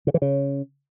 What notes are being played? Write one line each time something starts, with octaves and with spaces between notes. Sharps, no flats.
C#3
E3
C#3